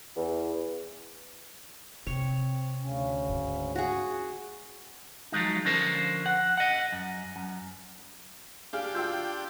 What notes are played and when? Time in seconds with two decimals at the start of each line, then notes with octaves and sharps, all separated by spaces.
0.16 E2
2.07 C3 C4 C#5
2.80 D2 C#3 C#4
3.29 G#2
3.76 F#4 G#4
5.32 F3 F#3 G#3 D#4
5.65 D3 F3 C#4 A#4 C5
6.26 F#5
6.57 D#5 F#5
6.92 F#2
7.36 F#2
8.73 D4 G4 G#4 F5 F6
8.94 F4 G5 E6 G6